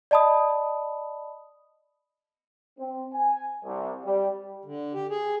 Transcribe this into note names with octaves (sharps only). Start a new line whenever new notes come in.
D5 D#5 A5 B5 D#6
C4
G#5
C2
G3
D3
G4
G#4